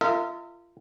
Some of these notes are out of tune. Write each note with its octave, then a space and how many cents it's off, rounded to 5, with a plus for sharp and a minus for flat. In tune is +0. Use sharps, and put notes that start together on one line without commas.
F4 -25 A#4 -35 E5 -40